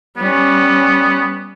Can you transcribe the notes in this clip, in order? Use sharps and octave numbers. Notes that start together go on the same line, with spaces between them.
G3 B3 C#4